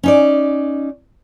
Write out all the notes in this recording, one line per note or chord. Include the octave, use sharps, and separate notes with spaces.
C#4 D#4 D5